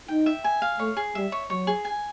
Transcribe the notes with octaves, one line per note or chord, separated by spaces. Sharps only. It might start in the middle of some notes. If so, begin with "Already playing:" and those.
D#4 G5
E5
G#5
F5
A3 C#5
G#4
G3 E5
C#5
F#3 C#5
G#4
G#5